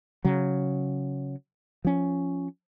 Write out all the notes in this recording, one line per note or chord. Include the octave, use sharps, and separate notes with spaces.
C#3 F#3
F3 C#4